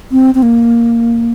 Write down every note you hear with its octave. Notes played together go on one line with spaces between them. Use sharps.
C4
C4
A#3